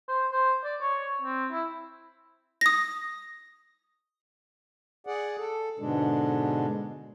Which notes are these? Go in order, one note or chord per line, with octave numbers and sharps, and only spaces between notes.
C5
C5
D5
C#5
C4
E4
D#6 A#6
G#4 D5 F#5
A4
G#2 B2 D3 G#3 D4